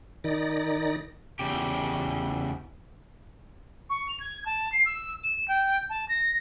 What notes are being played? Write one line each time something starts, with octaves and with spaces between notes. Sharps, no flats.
D#3 D#4 D5 A#6
E2 C#3 G4
C#6
F7
G#6
A5
C7
E6
E7
G5
A5
A#6